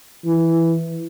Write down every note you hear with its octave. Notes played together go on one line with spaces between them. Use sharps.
E3